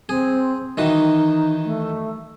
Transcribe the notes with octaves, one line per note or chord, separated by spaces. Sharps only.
C4 G#4
D#3 E3 D#4 F#4
A3